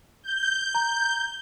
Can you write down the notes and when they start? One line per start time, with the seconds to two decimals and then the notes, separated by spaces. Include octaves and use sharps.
0.22 G6
0.75 A#5